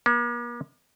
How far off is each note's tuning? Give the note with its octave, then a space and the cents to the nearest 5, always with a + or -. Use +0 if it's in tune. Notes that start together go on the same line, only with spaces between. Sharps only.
A#3 +45